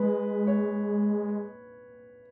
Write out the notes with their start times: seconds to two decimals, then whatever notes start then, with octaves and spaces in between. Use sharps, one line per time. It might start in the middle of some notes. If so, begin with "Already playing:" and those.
Already playing: G#3 B4
0.47 C#5